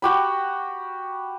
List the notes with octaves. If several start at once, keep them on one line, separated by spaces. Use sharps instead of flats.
F#4 G4 B5